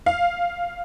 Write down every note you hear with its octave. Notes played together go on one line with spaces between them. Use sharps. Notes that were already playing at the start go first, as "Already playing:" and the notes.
F5